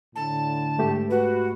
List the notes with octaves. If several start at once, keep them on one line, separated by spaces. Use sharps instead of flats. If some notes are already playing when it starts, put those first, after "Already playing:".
A2 D3 A5
G#2 A3 G4
F#4 B4